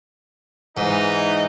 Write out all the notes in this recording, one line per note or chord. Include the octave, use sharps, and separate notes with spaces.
G#2 E3 D#4